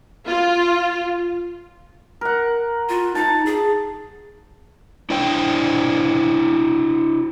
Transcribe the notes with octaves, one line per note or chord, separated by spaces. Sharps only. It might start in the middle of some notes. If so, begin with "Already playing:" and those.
F4
A#4 F#5
F4
D#4 A5
G#4
D4 E4 C5 G5